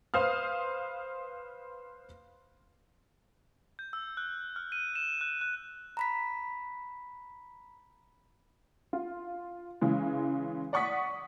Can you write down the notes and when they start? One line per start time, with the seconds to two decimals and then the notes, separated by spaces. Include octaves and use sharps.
0.14 B4 C5 F5 D#6 F6
3.79 G6
3.93 E6
4.17 F#6
4.56 F6
4.72 D#7
4.95 E7
5.21 F#6
5.41 F#6
5.97 A#5 B5 B6
8.93 F4
9.81 C#3 E3 G#3
10.73 D5 F#5 C#6 D#6 B6